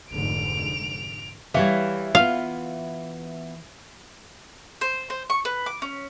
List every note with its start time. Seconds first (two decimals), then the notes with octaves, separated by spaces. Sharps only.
0.10 F1 G#2 D3 D7 F7
1.54 E3 G3 C#5 F5
2.15 B3 F4 F5
4.81 C5
5.10 C5
5.30 C#6
5.45 B4
5.66 D6
5.82 C#4